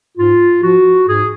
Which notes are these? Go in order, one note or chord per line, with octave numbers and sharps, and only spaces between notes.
G#2 F4
F3 F#4
G#2 G#4